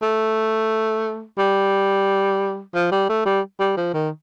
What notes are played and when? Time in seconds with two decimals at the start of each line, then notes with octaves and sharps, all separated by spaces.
0.02 A3
1.38 G3
2.75 F3
2.92 G3
3.09 A3
3.26 G3
3.60 G3
3.77 F3
3.94 D#3